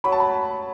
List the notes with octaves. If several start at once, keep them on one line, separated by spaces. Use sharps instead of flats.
F#3 B5
A5
B5